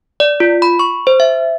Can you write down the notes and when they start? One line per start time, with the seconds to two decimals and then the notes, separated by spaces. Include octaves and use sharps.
0.20 D5
0.40 F4
0.62 B5
0.79 C#6
1.07 C5
1.20 E5